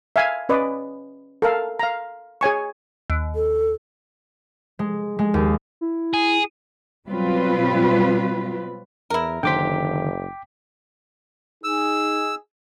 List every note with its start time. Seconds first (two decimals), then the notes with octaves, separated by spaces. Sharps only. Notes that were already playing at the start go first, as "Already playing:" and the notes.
0.16 E5 F5 G#5
0.49 C#4 B4 D5 D#5
1.42 A4 A#4 F5
1.79 F5 A#5
2.41 G#4 C#5 G#5 C#6
3.10 D#2
3.35 A4
4.79 G#3
5.19 G#3
5.34 D#2
5.81 E4
6.14 G#4
7.08 B2 F#3 G3 C4 F4 B4
9.10 E2 E4 A#4
9.43 F#1 D3 D#3 C5 G5 D6 B6
11.64 D#4 G#4 E6